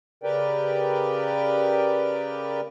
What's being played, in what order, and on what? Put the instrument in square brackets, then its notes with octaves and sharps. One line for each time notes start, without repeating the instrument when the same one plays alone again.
[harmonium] C#3 G4 A#4 B4 D5 G5